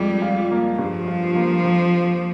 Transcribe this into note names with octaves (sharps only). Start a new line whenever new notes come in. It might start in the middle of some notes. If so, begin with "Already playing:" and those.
Already playing: F2 G3 G#3
F4
A#3
G2 F3
F4
A#3
F2